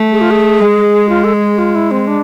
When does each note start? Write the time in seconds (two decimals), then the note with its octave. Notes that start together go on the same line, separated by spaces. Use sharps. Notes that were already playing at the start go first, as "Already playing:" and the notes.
Already playing: A3
0.12 G#4
0.21 F4
0.31 G#4
0.61 G#3
1.09 F4
1.24 A4
1.34 G#4
1.58 F4
1.75 E4
1.91 C4
2.07 D4